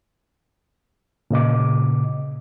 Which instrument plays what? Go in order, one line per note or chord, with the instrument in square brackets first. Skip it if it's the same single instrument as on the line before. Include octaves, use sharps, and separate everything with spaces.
[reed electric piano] A#2 C#3 D#5 D6